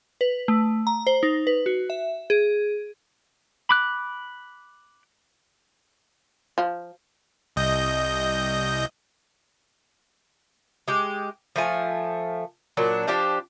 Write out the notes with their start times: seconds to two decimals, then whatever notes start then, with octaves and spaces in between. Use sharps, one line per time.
0.21 B4
0.48 A3
0.87 A#5
1.07 C5
1.23 D#4
1.47 B4
1.66 F#4
1.90 E5
2.30 G#4
3.69 B5 D6 F#6
6.58 F3
7.56 C2 D#5 G6
10.88 G#3 G4
11.56 F3 A3 G#5
12.77 A#2 F#3 D4
13.07 F3 D4 G4 C5